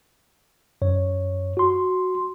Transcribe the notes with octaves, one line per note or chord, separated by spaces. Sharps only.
F#2 C#5
F#4 C6